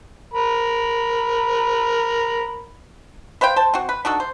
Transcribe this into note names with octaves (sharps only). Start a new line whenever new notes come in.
A#4 B5
B4 C5 F5 G5
C5 A5
C4 F#4
B4
D4 D#4 F#4 A4
C5